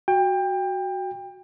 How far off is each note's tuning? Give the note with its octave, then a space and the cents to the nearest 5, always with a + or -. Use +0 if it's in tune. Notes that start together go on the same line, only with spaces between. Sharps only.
F#4 +0 G5 +25